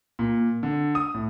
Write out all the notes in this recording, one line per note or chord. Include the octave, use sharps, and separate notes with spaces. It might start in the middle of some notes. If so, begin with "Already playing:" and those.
A#2
D3
D#6
A2